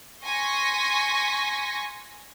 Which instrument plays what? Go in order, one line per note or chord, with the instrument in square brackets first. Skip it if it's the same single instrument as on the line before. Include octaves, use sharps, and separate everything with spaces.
[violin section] G#5 C6 C#6 A#6 B6